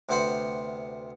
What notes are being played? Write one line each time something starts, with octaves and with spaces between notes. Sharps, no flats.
D2 C3 B3 C5 F#5 C6